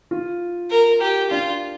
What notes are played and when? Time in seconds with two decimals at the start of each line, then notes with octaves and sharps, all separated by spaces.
0.11 F4
0.71 A#4
1.01 G4
1.30 D4 F4